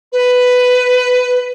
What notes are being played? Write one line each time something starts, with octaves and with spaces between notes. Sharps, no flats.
B4